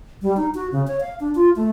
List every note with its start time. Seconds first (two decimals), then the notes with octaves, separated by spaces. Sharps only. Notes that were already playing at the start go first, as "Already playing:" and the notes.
0.22 G3
0.37 D#4
0.55 F#4
0.72 C#3
0.87 C#5
1.01 F5
1.20 D4
1.35 F4
1.56 A3